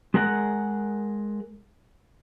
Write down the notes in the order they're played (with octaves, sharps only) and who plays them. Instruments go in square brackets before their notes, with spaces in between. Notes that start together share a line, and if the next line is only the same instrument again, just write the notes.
[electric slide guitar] G#3 G#4 A#4 F#5